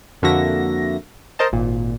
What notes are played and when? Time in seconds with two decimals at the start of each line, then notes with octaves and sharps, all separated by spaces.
0.22 F2 D3 A#3 F#4 E5 A#6
1.39 A#4 C5 D#5 A5
1.52 G#1 A#2